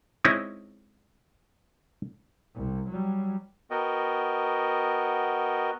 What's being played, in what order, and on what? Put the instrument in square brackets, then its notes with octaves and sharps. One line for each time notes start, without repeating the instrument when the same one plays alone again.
[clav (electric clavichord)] G#3 C4 C#4 D#4 E4
[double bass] C2
F#3 G3
[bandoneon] B3 F#4 A#4 D#5 G5